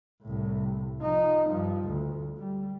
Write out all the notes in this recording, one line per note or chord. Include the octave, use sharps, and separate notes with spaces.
C2 A2
F3 D#4
G2 F3
D2
G3